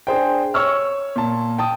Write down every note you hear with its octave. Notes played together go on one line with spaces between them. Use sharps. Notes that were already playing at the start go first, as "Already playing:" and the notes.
D4 G#4 C5 G5
C#5 C#6 E6 F6
A#2 A5
G5 A5 D#6